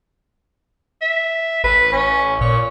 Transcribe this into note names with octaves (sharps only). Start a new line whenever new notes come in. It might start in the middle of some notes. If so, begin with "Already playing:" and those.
E5
A1 B4
C#4
A#2 C#5